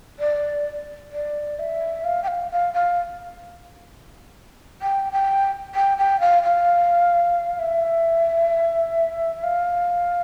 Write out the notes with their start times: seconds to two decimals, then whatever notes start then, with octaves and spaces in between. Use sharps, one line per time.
0.19 D5
1.12 D5
1.59 E5
2.04 F5
2.23 G5
2.28 F5
2.51 F5
2.73 F5
4.82 G5
5.13 G5
5.75 G5
5.98 G5
6.20 F5
6.43 F5
7.59 E5
9.44 F5